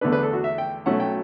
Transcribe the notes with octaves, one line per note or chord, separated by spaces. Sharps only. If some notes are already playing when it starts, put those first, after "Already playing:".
E2 D3 A3 D4 B4
B4
A4
F#4
E5
G5
B1 B2 F#3 A3 C#4 F#5
G5